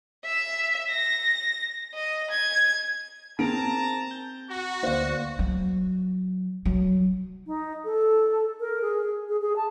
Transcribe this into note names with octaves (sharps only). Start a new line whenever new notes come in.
E5
A#6
D#5
G#6
C4 G#4 A#4 C5 A5 A#5 D7
G6
F#4 A#5
D2 A#3 C5 D5 F5
F#3
F#3
D#4
A4
A#4
G#4
G#4
G#4
A5